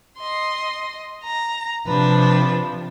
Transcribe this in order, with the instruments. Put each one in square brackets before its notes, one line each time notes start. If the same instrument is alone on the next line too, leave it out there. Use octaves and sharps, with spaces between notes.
[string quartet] D#5 C6
A#5
[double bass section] C3 F3 [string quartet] D4 B4